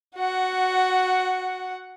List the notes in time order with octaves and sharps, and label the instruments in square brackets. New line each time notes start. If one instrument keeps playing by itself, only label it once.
[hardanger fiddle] F#4 F#5